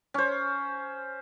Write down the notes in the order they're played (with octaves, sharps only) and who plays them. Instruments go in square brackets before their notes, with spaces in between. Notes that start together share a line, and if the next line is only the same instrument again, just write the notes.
[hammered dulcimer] C#4 C5